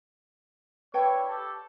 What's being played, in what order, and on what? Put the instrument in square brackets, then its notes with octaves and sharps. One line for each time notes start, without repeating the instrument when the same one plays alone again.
[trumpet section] D4 E4 C#5 [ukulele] B4 G5 A5
[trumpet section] G4 A4